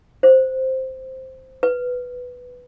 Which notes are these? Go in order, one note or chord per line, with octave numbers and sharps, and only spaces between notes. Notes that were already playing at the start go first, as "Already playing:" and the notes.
C5
B4